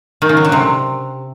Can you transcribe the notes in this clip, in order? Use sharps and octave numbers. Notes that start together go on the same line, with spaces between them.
D#3
C#3
F#3
D3
C3